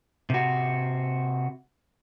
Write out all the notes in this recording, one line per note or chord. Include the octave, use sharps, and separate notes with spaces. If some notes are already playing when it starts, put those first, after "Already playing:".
C3 F#4